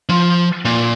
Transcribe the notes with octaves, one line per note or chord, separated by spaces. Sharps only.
F3
A#2